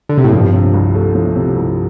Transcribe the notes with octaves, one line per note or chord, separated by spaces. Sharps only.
D3
C3
A2
G2 F3
C3
C2
A3
F3
C3
C2